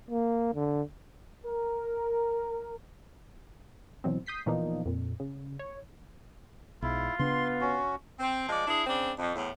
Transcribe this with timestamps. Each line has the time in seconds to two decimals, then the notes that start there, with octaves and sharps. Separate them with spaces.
0.11 A#3
0.54 D3
1.44 A#4
4.04 B2 E3 F#3 C4
4.26 D#6 G6 B6 C7
4.46 A#2 E3 F3 A#3 B3 D#4
4.85 F2 A#2
5.20 C#3
5.59 C#5
6.82 B1 G#2 E4 F4
7.19 C#3 B3 D4 C6
7.61 C#4 F#4
8.19 C4
8.47 F3 G#3 D5
8.66 D4 E4 G#4
8.86 C#3 C4 D4
9.17 F2
9.34 E2 A2